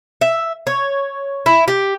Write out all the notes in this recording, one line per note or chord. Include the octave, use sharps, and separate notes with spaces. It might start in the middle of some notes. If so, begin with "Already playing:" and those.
E5
C#5
E4
G4